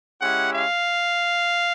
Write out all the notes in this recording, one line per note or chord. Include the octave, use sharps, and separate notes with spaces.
G#3 C#4 E4 G4 F#5
F5